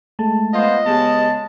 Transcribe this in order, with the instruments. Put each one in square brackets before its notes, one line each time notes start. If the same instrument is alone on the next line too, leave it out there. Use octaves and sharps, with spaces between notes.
[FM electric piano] G#3 A3 A5
[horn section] B3 F4 C5 [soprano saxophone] D#5
[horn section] C#3 G#3 A5 [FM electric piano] B3 G4